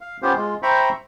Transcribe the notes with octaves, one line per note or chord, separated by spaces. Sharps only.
F5
B3 C#4 F4 G4 C5
G#3 F4
C5 E5 G5 A#5 B5 C#6